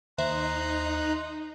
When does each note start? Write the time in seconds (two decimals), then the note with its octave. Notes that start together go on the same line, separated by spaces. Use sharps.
0.18 D#2 D#4 C5 E5 A#5 C6 F#6